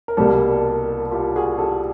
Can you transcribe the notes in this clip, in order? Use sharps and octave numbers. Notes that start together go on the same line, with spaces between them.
A#4
C2 B2 G3 A#3 G4 A4
F4 G4
F#4 G#4
G4 A4